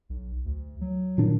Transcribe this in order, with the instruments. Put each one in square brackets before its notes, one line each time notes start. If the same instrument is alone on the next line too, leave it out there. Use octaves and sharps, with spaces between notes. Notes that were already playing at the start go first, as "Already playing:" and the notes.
[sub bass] B1
D2
F#3
[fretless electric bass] A#2 D#3 D4